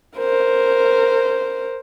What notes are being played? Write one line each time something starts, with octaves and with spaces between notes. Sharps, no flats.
A#4 C5